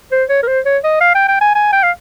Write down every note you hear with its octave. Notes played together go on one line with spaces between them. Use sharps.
C5
C#5
A#4
C5
C#5
D#5
F5
G5
G5
G#5
G#5
G5
F5